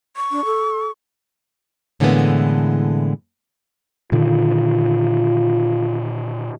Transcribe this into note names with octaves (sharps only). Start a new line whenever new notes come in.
C#6
D4
A4
A2 D3 E3 G#3 A#3 B3
A#2 D3 D#3 F4